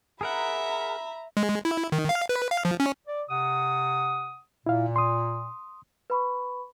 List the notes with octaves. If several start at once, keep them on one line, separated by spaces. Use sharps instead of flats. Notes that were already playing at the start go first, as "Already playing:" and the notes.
G#4 A#4 E5 F#5 A#5 B5
G#3
E4
D#3
F5
B4
F5
F3
C#4
D5
C3 F#5 D#6
A#2 E4 F5
C6 D#6
B4 B5 C#6